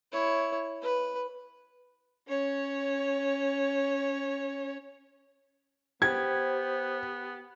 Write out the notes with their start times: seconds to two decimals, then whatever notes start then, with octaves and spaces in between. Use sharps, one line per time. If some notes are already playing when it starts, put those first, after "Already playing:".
0.13 E4 C#5
0.82 B4
2.28 C#4 C#5
6.02 B3 G4 C5 G#6